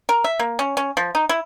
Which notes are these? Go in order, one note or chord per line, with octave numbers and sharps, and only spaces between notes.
A#4
E5
A#3
C#4
C#4
F3
D#4
E4